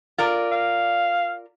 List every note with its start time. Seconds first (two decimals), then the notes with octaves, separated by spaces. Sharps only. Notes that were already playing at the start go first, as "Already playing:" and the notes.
0.18 F4 A#4 D5
0.52 F5